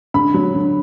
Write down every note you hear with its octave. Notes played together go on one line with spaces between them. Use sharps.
D3 B5
F#3
D3